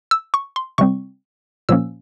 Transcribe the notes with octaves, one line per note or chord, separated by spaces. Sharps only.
E6
C#6
C6
C3 G3 C4 C#6
A#2 F3 A#3 C#4 E6